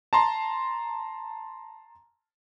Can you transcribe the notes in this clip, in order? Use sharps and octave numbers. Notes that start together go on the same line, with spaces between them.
A5 A#5 C6